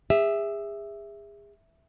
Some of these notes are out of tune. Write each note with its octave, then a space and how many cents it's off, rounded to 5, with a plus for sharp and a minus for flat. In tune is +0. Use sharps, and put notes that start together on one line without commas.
G#4 -35 E5 +0